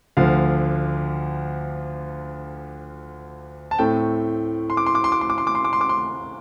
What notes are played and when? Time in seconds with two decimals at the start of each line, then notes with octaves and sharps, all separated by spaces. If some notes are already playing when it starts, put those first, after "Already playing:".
0.17 D2 D3 F3 F5
3.71 A5
3.79 A2 A3 C4 G5
4.70 C6
4.77 D6
4.86 C6
4.95 D6
5.04 C6
5.12 D6
5.21 C6
5.30 D6
5.38 C6
5.47 D6
5.55 C6
5.65 D6
5.73 C6
5.81 D6
5.89 C6